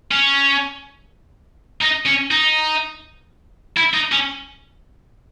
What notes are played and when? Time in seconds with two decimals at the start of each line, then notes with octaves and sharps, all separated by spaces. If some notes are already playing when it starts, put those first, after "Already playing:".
0.12 C#4
1.82 D#4
2.06 C#4
2.31 D#4
3.77 E4
3.94 D#4
4.12 C#4